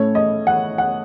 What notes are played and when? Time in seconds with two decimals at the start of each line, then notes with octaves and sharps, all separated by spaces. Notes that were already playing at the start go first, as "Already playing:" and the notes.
Already playing: A2 A3 C#4 C#5
0.15 D#5
0.47 F#5
0.78 F#5